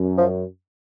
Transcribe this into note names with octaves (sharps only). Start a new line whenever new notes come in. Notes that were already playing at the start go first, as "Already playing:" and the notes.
Already playing: F#2
F3